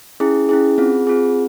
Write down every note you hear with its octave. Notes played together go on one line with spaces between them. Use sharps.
C#4 E4 G#4
C#4 E4 G#4
C4 F4 G#4
C4 F4 G#4